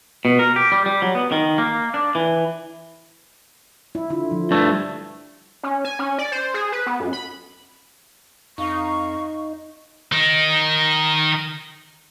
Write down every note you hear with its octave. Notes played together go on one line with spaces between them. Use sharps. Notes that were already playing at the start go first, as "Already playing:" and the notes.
B2
A#4
G4
G3
G3
F#3
B3
D#3
A#3
D4
E3
E4
D3 E4 F4
F3
G2 A3 D4
C#4
G#5
C#4
D5
C5
G#4
B4
B3
F#2
B5
F2 D#4 F5 C#6
D#3 D#4